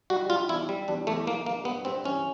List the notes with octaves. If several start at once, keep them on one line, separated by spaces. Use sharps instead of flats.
G3 F#4
G3 F4
E2 E4
G3
E2 D4
E2 A3
E3 A#3
G2 A#3
G2 B3
G2 C4
E3 C#4